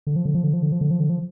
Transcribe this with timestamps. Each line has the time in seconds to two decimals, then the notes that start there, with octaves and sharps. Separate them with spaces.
0.07 D3
0.16 F3
0.26 D3
0.35 F3
0.44 D3
0.53 F3
0.63 D3
0.72 F3
0.81 D3
0.91 F3
1.00 D3
1.10 F3